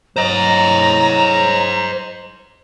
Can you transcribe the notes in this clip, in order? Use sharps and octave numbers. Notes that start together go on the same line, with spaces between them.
F#3 C5 D#5 A#5